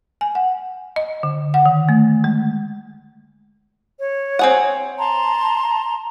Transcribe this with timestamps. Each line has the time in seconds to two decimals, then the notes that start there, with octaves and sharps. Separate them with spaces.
0.21 G#5
0.35 F#5
0.96 D#5
1.23 D3
1.54 F#5
1.66 D#3
1.89 A3
2.24 G#3
3.99 C#5
4.39 C4 G#4 F#5
4.98 A5 A#5 C6